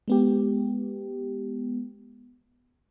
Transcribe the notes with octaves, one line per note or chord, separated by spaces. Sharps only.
G#3 B3 G4